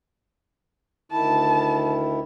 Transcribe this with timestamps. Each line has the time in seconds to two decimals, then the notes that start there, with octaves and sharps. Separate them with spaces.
1.12 D2 D#3 E4 A5